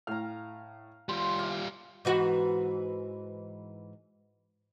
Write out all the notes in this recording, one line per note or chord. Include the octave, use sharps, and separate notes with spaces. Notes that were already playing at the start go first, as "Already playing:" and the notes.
A2 F5 A#5 F6
G3 F4 C6
D5 E5 F5
G#2 E3 F#4